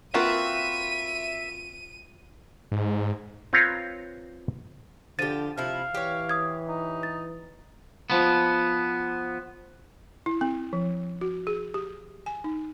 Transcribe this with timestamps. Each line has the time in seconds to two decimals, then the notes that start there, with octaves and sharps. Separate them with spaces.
0.14 A#3 C4 F4 F#4 A#4 B4 E5 D#7
2.72 G#2
3.53 C4 F4 B4 C#5 A#5
5.19 D3 F3 G4 A6 D#7
5.58 C3 F3 E4 F5
5.94 E3 G4 C#5
6.29 D#6 G#6
6.69 D#4
7.03 A6
8.10 F3 B3
10.26 E4
10.41 C4
10.73 F3
11.21 F#4
11.47 G#4
11.74 G4
12.26 G#5
12.44 D#4